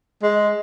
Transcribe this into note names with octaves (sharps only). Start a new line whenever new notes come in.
G#3